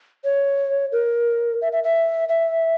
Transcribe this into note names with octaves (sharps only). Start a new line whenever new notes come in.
C#5
A#4
E5
E5
E5
E5